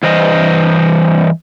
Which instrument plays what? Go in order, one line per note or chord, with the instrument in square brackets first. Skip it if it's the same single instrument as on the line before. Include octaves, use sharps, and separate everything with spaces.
[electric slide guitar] G2 E3 C5 D#5